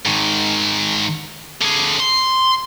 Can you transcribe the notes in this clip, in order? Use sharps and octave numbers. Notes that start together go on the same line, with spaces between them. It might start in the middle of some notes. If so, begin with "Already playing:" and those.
G#2 D#3
D3 G#4
C6